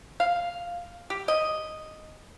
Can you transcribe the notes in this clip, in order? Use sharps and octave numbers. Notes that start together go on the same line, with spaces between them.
F5
G4
D#5